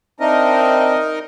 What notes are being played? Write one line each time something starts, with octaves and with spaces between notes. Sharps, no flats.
C4 D4 D#4 A#4 D#5 E5